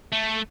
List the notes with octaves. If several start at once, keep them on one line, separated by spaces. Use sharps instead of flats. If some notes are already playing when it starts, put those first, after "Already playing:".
A3